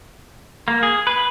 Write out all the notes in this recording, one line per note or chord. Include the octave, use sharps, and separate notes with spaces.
A#3
G#4
B4